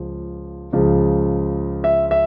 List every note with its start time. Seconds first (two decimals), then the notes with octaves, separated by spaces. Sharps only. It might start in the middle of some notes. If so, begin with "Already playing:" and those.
Already playing: C#2 F3
0.73 C#2 C#3 F3
1.84 E5
2.11 E5